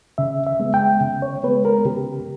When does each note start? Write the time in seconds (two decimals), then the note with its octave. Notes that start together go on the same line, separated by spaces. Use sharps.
0.18 C#3 E5
0.47 E5
0.60 G#3 B3
0.74 G5
1.01 C#3
1.22 C#5
1.43 G#3 B3 B4
1.65 A#4
1.85 C#3 G4